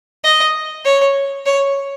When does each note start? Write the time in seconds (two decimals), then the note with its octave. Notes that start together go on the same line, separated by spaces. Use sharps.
0.24 D#5
0.85 C#5
1.46 C#5